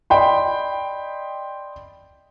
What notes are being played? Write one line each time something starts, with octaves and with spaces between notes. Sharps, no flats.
D5 D#5 G5 B5 C6